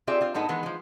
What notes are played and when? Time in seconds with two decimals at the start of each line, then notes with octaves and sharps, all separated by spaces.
0.07 C4 F4 G4 G#4 D5 E5
0.21 C4 F4
0.34 A2 G#3 B3 D#4 A4
0.48 D#3 E3 G#3 B3
0.63 F3 G#3